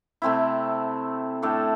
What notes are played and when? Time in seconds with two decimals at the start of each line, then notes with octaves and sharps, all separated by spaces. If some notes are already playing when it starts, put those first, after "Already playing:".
0.22 C3 A3 C4 E4
1.42 A2 A3 D4 A4